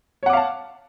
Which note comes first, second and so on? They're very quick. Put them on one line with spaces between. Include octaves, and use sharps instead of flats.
C#5 F#5 D6 F5 A5